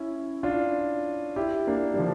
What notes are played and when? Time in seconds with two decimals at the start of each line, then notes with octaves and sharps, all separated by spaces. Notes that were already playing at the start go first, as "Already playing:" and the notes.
Already playing: C#4 E4
0.43 D4 F4
1.36 E4 G4
1.67 A#3 D4
1.94 G3
1.99 D3 F3